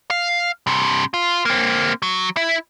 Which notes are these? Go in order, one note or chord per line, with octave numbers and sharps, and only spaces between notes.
F5
G2 C3
F4
A#3 C4
F#3
E4